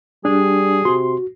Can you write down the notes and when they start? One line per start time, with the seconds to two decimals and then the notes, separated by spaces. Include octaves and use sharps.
0.25 G3 D4 G#4
0.85 C3 F#4 C6